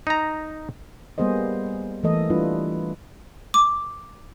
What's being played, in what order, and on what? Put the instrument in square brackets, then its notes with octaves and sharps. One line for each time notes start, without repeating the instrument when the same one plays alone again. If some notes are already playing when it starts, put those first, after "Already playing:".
[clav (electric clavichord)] D#4 A#5
[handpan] G3 A#3 B3 G#4 C5 D#5
E3 A3 A#3 A4 D#5
G3 D4 E4 F4 B4
[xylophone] D6